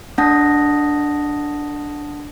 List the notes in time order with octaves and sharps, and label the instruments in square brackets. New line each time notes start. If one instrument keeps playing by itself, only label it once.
[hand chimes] A3 D4 F#5 A5 D#6 A#6